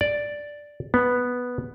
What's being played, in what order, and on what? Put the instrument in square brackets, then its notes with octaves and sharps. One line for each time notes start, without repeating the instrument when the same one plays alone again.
[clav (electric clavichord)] D5
B3